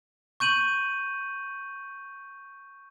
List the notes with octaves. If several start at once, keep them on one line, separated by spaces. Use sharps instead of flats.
C#6 G6 D#7 F#7